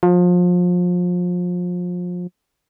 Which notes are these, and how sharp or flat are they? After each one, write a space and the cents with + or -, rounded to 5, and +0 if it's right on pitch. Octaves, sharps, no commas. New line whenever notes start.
F3 +30